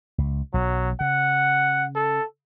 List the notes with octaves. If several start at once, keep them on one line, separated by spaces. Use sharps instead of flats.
C#2
B1 F#3
C#3 F#5
A4